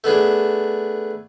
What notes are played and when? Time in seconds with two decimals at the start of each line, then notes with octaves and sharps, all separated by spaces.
0.04 A3 B3 D4 G#4